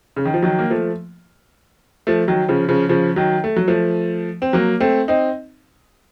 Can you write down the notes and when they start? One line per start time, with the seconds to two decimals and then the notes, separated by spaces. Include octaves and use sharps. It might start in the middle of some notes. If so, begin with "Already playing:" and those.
0.16 C#3
0.25 D#3
0.34 F3
0.42 D#3 F#3
0.59 A#3
0.70 F3 A3
2.07 F3 A3
2.28 D#3 F#3
2.48 C#3 F3
2.69 C#3 F3
2.89 C#3 F3
3.16 D#3 F#3
3.44 A3
3.56 F#3
3.68 F3 A3
4.42 C4
4.53 F#3 A#3
4.80 A3 C4
5.08 C4 D#4